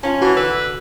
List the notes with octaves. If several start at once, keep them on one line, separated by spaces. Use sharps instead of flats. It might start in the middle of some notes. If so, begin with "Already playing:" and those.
C#4 F4 A5
E3 F#4
D3 B4 E6